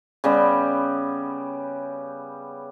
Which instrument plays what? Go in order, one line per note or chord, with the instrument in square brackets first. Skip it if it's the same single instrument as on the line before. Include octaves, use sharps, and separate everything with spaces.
[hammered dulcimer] C#3 G3 B3